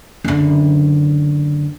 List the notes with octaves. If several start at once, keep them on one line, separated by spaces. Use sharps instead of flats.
F#1 D3